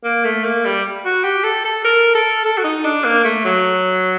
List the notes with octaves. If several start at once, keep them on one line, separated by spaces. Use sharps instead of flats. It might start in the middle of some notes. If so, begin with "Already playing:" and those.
A#3
A3
A#3
G3
F#4
G4
A4
A4
A#4
A4
A4
F#4
D#4
D4
A#3
A3
F#3